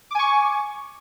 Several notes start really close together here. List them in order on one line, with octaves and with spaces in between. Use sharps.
D6 G#5 C#6